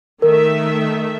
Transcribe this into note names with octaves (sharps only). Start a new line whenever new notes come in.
D#3 A3 A#4 E5